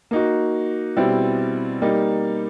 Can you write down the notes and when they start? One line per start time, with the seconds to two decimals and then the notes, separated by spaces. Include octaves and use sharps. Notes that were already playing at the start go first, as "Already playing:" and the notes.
0.11 A#3 D#4 F#4
0.97 B2 G3 C4 E4
1.82 G3 A#3 D#4